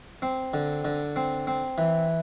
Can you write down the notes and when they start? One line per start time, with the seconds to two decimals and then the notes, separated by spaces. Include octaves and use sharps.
0.22 C4
0.54 D3
0.85 D3
1.16 C4
1.47 C4
1.78 E3